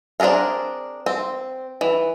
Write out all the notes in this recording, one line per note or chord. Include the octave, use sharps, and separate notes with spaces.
C4 D4 G#4 A#4 F5
C4
E3